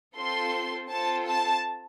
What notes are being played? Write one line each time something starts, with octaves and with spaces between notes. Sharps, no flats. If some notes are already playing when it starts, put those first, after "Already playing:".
C4 F4 A4 C6
C4 F4 A4 A5
A5